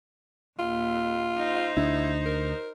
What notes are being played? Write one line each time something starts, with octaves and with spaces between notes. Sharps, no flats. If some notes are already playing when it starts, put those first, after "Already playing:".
D#2 A#2 F4
D#4 C5
D2 D4 E4
A#4